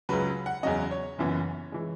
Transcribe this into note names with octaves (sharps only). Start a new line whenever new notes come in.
C#2 C#3 F#3 B4
F#5
E2 C#3 F#3 C#4 D#5
C#5
F#1 F#2 E3 B3
E3 G#3